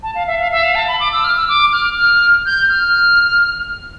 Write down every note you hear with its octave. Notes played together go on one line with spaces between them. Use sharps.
A5
F5
E5
F5
E5
F5
A5
B5
D6
E6
F6
E6
D6
F6
F6
G6
F6